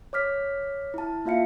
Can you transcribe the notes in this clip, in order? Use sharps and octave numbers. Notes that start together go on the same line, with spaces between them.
C#5 D6 F6 B6
E4 A5
A#3 F4 E5 F5 C#7